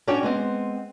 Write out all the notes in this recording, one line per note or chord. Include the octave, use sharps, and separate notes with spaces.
C#4 D4 F#4 C#5 G5
G#3 B3 C4